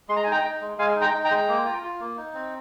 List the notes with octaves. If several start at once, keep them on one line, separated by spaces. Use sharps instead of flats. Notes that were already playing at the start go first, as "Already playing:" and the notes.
G#3 C6
A#5
G#5
D#4 G5 A#5
D#4
G#3
G#3 F5 G#5
D#4
G5 A#5
D#4
G5 A#5
G#3
A#3
F4
F4
A#3
D#4
C4